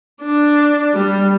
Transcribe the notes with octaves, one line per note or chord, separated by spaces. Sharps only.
D4
G3